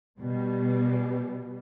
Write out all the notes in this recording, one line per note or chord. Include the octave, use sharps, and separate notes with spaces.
B2 G3